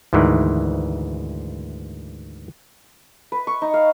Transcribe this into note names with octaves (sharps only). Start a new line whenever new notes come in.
D2 G#2 D#3 E3
B4
C#6
D#4
F5